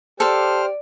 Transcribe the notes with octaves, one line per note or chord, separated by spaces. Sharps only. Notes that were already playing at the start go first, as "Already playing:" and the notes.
G4 A4 C5 D5 F5 F6